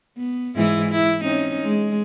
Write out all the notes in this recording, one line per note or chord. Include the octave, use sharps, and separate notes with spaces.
B3
G#2 E3 E4
E4
C4 C#4 D#4
G#3